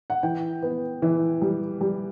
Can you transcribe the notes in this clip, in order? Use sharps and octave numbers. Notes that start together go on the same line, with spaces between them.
F#5
E3 G5
B3
E3
G3
G3